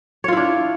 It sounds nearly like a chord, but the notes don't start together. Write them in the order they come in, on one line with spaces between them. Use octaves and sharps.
C#5 F4 E4 D4